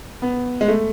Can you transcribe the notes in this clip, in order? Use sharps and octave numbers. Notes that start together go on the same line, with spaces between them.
B3
G#3
A3